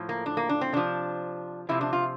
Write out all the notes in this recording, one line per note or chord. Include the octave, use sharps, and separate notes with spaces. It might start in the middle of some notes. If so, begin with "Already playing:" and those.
Already playing: A2 F3
A#3
D4
A#3
D4
C4
C3 F3 D4
C3 F3 E4
D4
F4